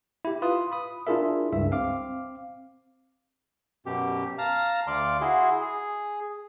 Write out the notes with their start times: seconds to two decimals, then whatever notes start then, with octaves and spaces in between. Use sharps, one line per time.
0.25 E4 G4
0.42 F4 B4 D#6
0.72 B5 D#6
1.07 D4 E4 F4 G#4 A#4 E5
1.53 C#2 G2 E5
1.71 C4 F5 D6
3.86 F#2 B2 G4
4.38 F5 A5 A#5 F6
4.87 D2 D5 F5 C6
5.21 E4 F#4 G#4 C6
5.61 G#4